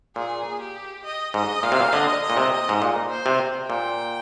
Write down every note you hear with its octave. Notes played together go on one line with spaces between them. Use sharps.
A#2 G#4
G4
D#5
G#2 D#5
A#2 F5
C3
A#2
D3 D#5
D#5
A#2
C3
D#5
G#2
A#2
C5
C3
A#2 G5